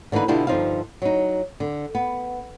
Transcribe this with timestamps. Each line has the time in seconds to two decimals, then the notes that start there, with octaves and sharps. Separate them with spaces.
0.12 D3 E3 A#3 D#4 B4
0.28 B2 D3 D4 E4 F4 G4
0.47 G2 D3 F3 D#4 C5 F5
1.02 F#3 D#4
1.60 D3
1.95 B3